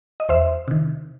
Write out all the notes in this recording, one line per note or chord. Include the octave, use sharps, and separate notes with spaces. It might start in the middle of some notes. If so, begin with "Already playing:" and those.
D#5
E2 C5 E5
C3 D#3